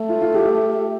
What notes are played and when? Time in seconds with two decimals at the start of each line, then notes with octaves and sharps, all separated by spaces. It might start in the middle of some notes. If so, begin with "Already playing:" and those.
Already playing: A3
0.09 F4
0.22 F4
0.34 G4